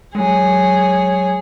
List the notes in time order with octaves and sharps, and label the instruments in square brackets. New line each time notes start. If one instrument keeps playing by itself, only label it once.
[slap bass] F#3 G#3 [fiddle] G#4 C#5